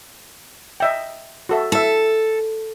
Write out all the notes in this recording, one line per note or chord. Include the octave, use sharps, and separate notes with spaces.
D#5 E5 G5
F#4 A4 E5
E4 A4 E5